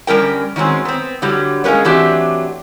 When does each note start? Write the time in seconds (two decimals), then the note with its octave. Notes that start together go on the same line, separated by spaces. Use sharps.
0.07 D3 G3 C#4 A#4 G5
0.56 D#3 F#3 G#3 C4 C#4
0.85 B3 C4
1.22 D3 F#3 G3
1.64 G#3 A#3 C#4 B4 C#5
1.85 E3 F#3 A3 C4 D4 G4